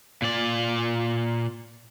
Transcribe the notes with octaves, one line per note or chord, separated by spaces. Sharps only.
A#2 D5